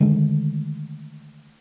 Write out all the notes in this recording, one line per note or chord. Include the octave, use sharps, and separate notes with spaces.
D3 D#3 G#3 A3